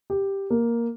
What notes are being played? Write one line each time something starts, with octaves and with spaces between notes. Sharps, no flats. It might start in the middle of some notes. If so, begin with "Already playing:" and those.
G4
A#3